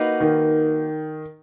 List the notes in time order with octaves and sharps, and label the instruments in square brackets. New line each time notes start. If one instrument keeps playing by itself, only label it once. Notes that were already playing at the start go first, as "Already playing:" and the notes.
Already playing: [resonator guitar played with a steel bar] A#3 D#4 F#4 B4
[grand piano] D#3